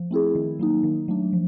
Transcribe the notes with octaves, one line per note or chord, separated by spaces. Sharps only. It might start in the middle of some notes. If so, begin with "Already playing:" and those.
Already playing: F3
A3 C4 E4 G#4
D#3
F#3 A#3 D#4
D#3
F#3 A3 D4
F3